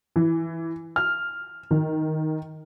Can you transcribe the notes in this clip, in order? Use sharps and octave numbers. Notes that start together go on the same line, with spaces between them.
E3
F6
D#3